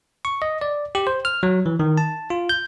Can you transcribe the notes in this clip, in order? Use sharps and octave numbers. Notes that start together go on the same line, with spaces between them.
C#6
D#5
D5
G4
C5
F6
F#3
E3
D#3
A5
F4
G6